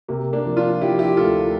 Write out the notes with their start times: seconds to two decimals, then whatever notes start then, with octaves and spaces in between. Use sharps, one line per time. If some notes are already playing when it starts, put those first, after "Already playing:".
0.08 C3 A#3
0.33 A#3 D4
0.46 F3
0.57 D4 F4
0.81 F3 E4 G4
0.99 E4 G4
1.17 D2 F4 A4